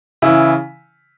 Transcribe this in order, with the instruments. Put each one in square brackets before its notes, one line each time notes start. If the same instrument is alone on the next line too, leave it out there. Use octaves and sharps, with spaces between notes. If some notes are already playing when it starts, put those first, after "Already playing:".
[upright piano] C#3 E3 E4